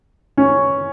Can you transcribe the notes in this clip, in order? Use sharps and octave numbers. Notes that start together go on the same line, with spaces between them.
C#4